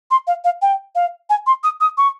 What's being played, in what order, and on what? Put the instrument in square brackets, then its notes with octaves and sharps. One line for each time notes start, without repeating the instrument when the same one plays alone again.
[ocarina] C6
F5
F5
G5
F5
G#5
C6
D#6
D#6
C#6